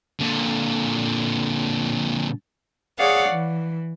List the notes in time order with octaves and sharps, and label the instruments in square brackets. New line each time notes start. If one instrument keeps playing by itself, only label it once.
[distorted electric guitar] A#2 D3
[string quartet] G#4 C#5 D5 F5 F#5
E3